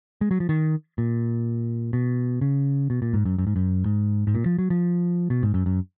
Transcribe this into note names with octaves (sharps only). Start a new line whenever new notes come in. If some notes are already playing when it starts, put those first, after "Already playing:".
G#3
F#3
F3
D#3
A#2
B2
C#3
B2
A#2
G#2
F#2
F#2
G#2
F#2
G#2
G#2
A#2
F3
F#3
F3
B2
G#2
F#2
F#2